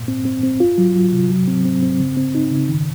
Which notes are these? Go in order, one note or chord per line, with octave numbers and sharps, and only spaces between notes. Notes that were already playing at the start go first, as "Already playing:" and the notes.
Already playing: A#2
C4
C4
C4
F4
F#3
F#3
C3
F#3
C4
C4
C4
C#3
C4
D#4
C#3
D#3